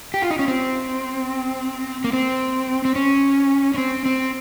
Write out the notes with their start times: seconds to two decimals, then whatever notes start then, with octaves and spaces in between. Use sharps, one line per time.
0.14 G4
0.22 F4
0.31 D#4
0.39 C#4
0.48 C4
2.04 A#3
2.13 C4
2.85 C4
2.96 C#4
3.74 C#4
3.78 C4
4.06 C4